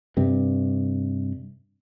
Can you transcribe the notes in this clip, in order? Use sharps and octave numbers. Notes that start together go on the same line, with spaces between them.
G2 C3